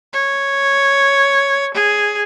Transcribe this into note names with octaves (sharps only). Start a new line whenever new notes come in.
C#5
G#4